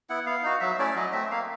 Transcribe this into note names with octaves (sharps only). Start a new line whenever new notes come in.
B3 E4 F#5
B3 F5
D#4 F#4
F#3 E5
A3 C#4 E4 D5
F#3 D#5
A3 C4 E5
A#3 F5